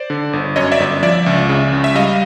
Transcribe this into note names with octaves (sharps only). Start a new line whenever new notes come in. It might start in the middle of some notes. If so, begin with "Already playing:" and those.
Already playing: C5 D5
D3
G1
F#2 C#5 D#5
D5 E5
G1
F3 D5 E5
C#2
C#3
C#2
E5
G3 D#5 F5